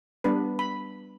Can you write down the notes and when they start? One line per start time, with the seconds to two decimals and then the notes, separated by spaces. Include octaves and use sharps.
0.24 G3 B3 D4 B4
0.59 B5